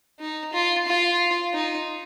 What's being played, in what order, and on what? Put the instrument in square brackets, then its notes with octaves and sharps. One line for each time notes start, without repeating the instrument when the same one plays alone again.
[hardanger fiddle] D#4
F4
F4
D#4